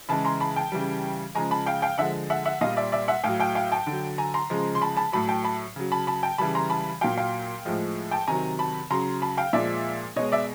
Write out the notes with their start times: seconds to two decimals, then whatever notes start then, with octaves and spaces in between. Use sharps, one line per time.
0.09 C#3 E3 G#3 A5 B5
0.25 A#5 C6
0.40 A5 B5
0.56 G5 A5
0.72 C#3 E3 G3
1.35 C#3 F3 G#3 G#5 A#5
1.51 A5 B5
1.66 F5 G5
1.82 F5 G5
1.98 D3 F3 G#3 E5 F#5
2.30 E5 F#5
2.45 E5 F#5
2.61 A#2 G3 D#5 F5
2.77 D5 E5
2.92 D5 E5
3.08 E5 F#5
3.24 A2 F#3 F5 G5
3.40 F5 G5
3.55 F5 G5
3.72 G5 A5
3.87 D3
3.92 F#3
4.18 G#5 A#5
4.34 A#5 C6
4.50 C#3 F3 G#3
4.75 C6
4.82 A5 B5
4.97 A5 B5
5.12 A2 F#3 A5 B5
5.28 G5 A5
5.44 A5 B5
5.76 C#3 F#3
5.92 A5 B5
6.07 A5 B5
6.23 G5 A5
6.38 C#3 E3 G3 A5 B5
6.55 A#5 C6
6.70 A5 B5
7.01 A#2 F#3 F5 G5
7.18 F5 G5
7.65 A2 F3 G#3
8.11 G5 A5
8.27 C3 D#3 F#3 G#5 A#5
8.59 A5 B5
8.90 C#3 F#3 A#5 C6
9.22 A5 B5
9.38 F5 G5
9.53 A#2 F3 G#3 D5 E5
10.16 B2 G#3 C#5 D#5
10.32 D5 E5